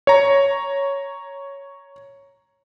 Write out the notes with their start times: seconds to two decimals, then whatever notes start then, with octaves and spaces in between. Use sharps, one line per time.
0.07 C#5 A#5